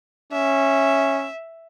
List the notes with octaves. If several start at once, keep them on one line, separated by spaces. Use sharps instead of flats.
C#4 E5